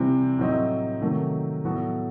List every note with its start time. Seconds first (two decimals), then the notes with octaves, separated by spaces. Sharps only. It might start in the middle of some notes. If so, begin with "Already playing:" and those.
Already playing: C3 E3 G3 C4
0.38 A2 F#3 C4 D#4
1.01 C3 D#3 F#3 A3
1.65 A2 F#3 B3 F#4 A4